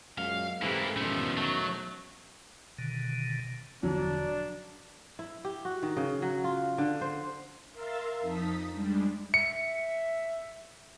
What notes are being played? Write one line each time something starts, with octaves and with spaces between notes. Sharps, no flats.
F#2 A#2 G#3 F5
G#2 E3 A#3 C4 E4 G4 A4 B4
E2 B2 D#3 F3 A3 C#4
F#3 A3
B2 D3 D#3
E1 D3 F3 F#3 D4
E4
G4
F#4
D#3
C#3
F#3
F4
D3
C5
A#4 E5 F5 C6 E6 A6
F2 D#4 A5 D#6 B6
G3 G#3 D4
E5 C#7